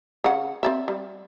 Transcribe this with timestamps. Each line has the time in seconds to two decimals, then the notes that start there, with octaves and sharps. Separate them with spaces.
0.24 C#3 F#5
0.63 C4 D5 E5
0.88 G3